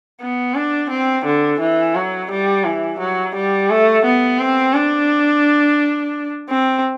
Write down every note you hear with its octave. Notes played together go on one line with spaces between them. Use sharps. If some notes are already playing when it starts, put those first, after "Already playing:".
B3
D4
C4
D3
E3
F#3
G3
E3
F#3
G3
A3
B3
C4
D4
C4